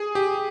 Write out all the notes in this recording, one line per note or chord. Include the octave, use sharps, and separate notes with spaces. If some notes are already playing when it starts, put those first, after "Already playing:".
Already playing: G#4
G4